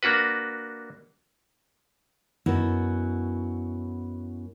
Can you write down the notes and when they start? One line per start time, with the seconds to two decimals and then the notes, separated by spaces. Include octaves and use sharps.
0.03 A#3 D4 F#4 B4
2.46 F#2 B3 E4 F#4 D#5